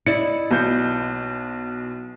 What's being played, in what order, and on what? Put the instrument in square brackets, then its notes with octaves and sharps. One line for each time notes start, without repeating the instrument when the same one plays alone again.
[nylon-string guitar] E4 D5 D#5 [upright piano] C#7
[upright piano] B1 B2 G6